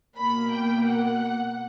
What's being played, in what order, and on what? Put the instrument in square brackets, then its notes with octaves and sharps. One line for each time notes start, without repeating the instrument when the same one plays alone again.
[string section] B2 A#3 B5
G5
F#5